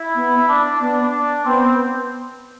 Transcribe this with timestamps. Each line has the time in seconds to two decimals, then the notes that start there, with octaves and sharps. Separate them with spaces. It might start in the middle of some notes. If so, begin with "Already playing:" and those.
Already playing: E4
0.15 B3
0.48 D4
0.80 B3 D4
1.45 B3 C4